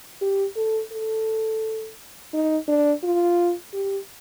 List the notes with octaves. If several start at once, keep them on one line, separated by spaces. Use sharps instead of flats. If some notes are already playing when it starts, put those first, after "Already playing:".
G4
A4
A4
D#4
D4
F4
G4